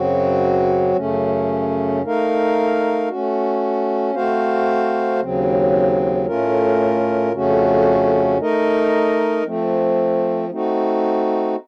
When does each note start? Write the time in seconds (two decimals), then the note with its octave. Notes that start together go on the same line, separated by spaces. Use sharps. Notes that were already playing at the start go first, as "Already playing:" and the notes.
Already playing: F#2 C#3 F#3 C4 F#4
0.96 F#2 C#3 A3 C#4
2.03 A3 D#4 A#4 F5
3.08 A3 C#4 F#4
4.14 A3 C4 F#4 C5 F5
5.20 D#2 C#3 F#3 C4
6.26 A2 A3 C#4 F4 A#4
7.32 F2 C#3 A3 C#4 F#4
8.38 A3 D#4 A#4 D#5
9.45 F3 A3 C4
10.50 A3 C4 D#4 F#4